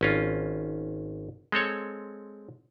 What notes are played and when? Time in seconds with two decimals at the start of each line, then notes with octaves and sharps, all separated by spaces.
0.01 G#1 C#4 F4
1.52 G#3 C4 A4 C#5